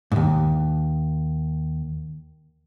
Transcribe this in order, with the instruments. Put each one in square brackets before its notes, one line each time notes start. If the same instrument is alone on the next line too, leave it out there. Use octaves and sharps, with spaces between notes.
[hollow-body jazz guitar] D#2 G#2